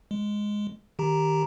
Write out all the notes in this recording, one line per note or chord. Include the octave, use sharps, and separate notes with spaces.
G#3
D#3 G4 A#5